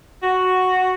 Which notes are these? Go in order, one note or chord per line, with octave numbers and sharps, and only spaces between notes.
F#4